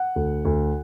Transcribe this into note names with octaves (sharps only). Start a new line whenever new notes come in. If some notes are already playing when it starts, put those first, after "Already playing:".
Already playing: F#5
D2
D2